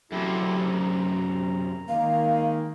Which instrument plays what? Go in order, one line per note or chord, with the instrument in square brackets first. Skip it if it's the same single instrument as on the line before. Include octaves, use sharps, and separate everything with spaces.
[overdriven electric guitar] F#2 C3 [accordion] E4 G4 A4
[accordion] A#5
[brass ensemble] D#3 G#3 A#3 [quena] F5